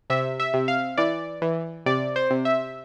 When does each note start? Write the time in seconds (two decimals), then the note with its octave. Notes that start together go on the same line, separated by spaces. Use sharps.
0.10 C3 E5
0.40 E5
0.54 C3
0.68 F5
0.98 E3 D5
1.42 E3
1.86 C3 D5
2.16 C5
2.31 C3
2.45 E5